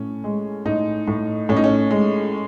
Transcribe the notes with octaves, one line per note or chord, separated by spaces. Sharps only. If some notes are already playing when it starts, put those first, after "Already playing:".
Already playing: A2 C#4
G#3
A2 D#4
A2
A2 C#4
D#4
C#4
G#3